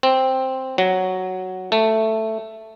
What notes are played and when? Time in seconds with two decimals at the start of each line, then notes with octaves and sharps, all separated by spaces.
0.03 C4
0.78 F#3
1.72 A3